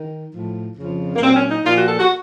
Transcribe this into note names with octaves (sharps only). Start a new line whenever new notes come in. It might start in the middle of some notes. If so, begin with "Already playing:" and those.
Already playing: D#3
A2 F3
F2 C#3 F3
A#3
A#2 F#3 C4
C#4
D#4
A#2 F3 F4
F#4
A4
F#4